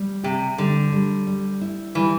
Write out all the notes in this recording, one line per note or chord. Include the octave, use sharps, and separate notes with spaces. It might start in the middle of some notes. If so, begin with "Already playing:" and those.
Already playing: G3
C3 G4
D3 G3
G3
G3
E4
E3 G3